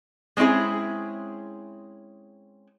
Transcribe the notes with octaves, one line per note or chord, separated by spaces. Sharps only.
G#3 C4 C#4 E4 G#4